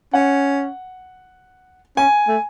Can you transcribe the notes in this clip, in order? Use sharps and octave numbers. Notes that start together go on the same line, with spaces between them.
C#4 F#5
C#4 G#5
A3